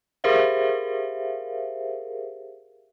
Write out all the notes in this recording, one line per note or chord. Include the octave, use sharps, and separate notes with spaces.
G4 G#4 A#4 C5 E5 F5